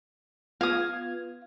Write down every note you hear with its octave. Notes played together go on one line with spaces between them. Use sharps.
B3 F4 F5 D#6 G#6